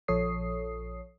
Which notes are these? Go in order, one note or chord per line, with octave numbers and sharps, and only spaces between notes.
A#1 F3 A4 C#5 D#6 C7